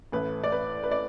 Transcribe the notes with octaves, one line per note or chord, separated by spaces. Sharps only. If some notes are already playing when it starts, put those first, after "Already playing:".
A1 A2 A3 B4
D5
B4
B4
D5